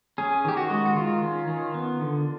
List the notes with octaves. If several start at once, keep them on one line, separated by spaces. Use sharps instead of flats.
C#4 G#4
D#3 G4
F#4
G#3
F#4
D#3 F4
C#4
D#3
B3
D3